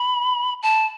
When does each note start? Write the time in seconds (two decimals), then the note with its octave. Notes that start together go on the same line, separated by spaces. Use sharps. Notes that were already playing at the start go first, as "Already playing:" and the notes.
Already playing: B5
0.63 A5